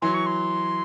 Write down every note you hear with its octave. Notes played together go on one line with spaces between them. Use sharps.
E3 F#3 C6
C#6
C6